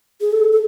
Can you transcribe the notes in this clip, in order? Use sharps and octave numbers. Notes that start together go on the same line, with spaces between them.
G#4
A4
A4